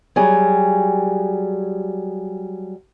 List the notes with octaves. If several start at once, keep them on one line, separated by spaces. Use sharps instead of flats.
F#3 G3 G#4